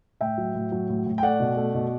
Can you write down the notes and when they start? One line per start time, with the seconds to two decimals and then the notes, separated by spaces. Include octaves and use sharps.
0.21 A2 E5 G5
0.38 F#3
0.55 A2
0.72 F#3
0.89 A2
1.06 A2
1.18 G5
1.23 A3 D5 F#5
1.40 B2
1.57 A3
1.74 B2